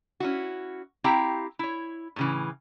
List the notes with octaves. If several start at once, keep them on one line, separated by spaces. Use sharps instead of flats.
C#4 E4 F#4
C4 E4 G4 F5 G5 A#5
E4 C#5
A2 C#3 E3